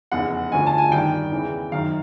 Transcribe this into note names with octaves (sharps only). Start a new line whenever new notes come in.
F1 E2 C#3 F#5
E1 D2 D3 F3 G#5
A5
G#5
A1 G2 D#3 G5
E2 C#3 E3
F#1 F#2 D#3 F5